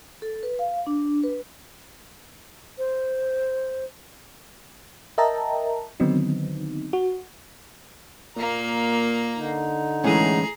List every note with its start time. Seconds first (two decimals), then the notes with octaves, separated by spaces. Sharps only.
0.22 A4
0.43 B4
0.59 F5
0.87 D4
1.24 B4
2.78 C5
5.18 A#4 D#5 E5 G5 A5 A#5
6.00 D3 D#3 F#3 B3 C4 D#4
6.93 F#4
8.37 A#2 A#3 A#5
9.36 D3 D#4
10.04 A2 E3 G#3 C#4 G#4 A#5